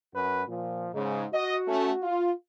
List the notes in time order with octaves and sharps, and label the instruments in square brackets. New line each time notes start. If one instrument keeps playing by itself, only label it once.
[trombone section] F#2 F#4 B4
A#2 F3
[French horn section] G#2 [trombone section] C#3
[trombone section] F#4 [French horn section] D#5
[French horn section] A3 C#4
F4